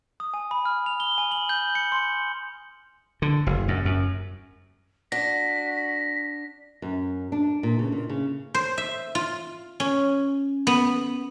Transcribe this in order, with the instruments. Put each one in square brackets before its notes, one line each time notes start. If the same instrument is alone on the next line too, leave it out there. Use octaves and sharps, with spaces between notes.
[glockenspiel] D#6
G#5
B5
F6
F7
G7
G#5
F#7
G6
C#7
C6
[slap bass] D3
F#1
F#2
F#2
[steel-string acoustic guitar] D4 [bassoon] F#4 [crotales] A#6 [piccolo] B6
[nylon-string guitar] F#2
D4
A#2
C#3
A#2
C#3
[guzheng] C5
E5
F4
C#4
B3